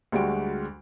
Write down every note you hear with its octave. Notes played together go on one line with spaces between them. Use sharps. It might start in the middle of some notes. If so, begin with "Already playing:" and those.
D2 G3 G#3 F#4 D7